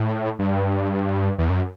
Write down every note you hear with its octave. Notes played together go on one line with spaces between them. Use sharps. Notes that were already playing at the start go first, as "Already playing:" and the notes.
Already playing: A2
G2
E2
F#2